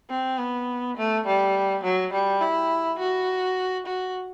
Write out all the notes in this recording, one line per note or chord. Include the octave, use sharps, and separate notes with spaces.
C4
B3
A3
G3
F#3
G3
E4
F#4
F#4